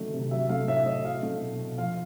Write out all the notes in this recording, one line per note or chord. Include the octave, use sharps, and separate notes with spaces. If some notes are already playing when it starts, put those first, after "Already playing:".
Already playing: D3 D#3 F#3 A3
C3
F#3 E5
A3 F5
A2 E5
A2 D#5
F#3 F5
A3
B2
B2
F3 F5